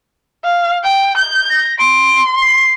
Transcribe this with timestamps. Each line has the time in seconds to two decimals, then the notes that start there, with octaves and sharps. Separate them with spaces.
0.44 F5
0.84 G5
1.17 G6
1.50 A#6
1.79 C6 D7
2.42 C7